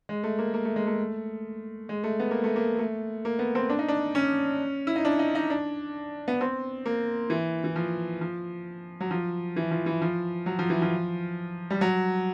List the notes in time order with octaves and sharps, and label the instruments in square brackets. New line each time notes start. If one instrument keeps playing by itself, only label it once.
[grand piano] G#3
A3
A#3
A#3
A3
G#3
A3
G#3
A3
B3
A#3
A3
A#3
A3
A#3
B3
C4
D4
D#4
D4
C#4
E4
D#4
D4
D#4
D#4
D4
B3
C4
A#3
E3
E3
F3
F3
F#3
F3
E3
F3
E3
F3
F#3
F3
E3
F3
G3
F#3